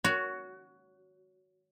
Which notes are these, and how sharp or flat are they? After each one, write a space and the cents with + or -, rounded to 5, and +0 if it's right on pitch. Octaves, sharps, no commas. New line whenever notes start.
F#4 +0 C#5 +20